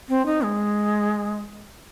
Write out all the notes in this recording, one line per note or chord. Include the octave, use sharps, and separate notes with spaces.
C4
D#4
G#3